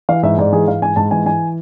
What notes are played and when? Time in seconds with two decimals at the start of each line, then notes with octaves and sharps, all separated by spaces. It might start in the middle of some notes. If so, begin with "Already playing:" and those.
0.09 E3 F5
0.23 G#2 E5
0.38 G#2 D5
0.52 E3 G#4
0.68 E3 F5
0.82 G#2 G#5
0.96 G#2 A5
1.11 E3 G#5
1.26 E3 G#5